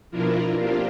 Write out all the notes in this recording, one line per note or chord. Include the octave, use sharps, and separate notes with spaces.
B2 F3 D4 E4 F4 A#4
A#3 C4 D4 F4 G4